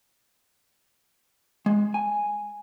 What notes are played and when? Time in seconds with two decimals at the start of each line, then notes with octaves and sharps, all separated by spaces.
1.66 G#3
1.94 G#5